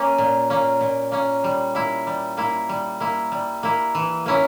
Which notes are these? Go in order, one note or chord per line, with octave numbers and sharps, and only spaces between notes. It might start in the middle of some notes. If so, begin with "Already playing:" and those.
Already playing: A#3 C#4
A#2
A#3 C#4
A#2
A#3 C#4
G3
A#3 E4
G3
A#3 E4
G3
A#3 E4
G3
A#3 E4
E3
A#3 C#4 E4